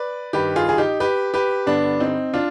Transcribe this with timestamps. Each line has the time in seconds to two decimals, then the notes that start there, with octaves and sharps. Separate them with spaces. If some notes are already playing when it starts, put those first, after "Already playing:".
Already playing: B4 D5
0.33 G2 D#3 G4 B4
0.56 F4 G#4
0.69 G#4
0.78 D#4 G4
1.00 G4 B4
1.34 G4 B4
1.66 G2 D3 B3 D4
2.00 C4 D#4
2.34 D4 F4